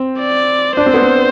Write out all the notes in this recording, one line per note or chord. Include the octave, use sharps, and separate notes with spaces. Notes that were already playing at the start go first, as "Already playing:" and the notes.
Already playing: C4
D5
D4 C5
C4
B3
C4